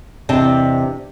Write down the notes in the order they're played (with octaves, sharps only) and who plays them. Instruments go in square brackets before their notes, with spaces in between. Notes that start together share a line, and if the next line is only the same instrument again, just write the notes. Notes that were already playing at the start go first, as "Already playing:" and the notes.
[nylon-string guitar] E2 C3 D4 D#5 A5